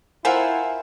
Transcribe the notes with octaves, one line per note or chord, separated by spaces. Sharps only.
E4 F4 A#4 C5 E5 F#5 G#5